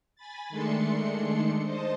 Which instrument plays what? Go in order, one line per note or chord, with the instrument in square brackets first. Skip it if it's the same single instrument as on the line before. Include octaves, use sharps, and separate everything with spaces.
[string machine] G#5 B5 A6
D#3 G#3 A3 D4 C6 C#7
C5 D#5 A5